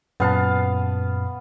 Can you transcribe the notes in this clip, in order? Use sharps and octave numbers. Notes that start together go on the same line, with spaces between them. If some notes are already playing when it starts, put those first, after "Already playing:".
F#2 A#2 B3 F5 A5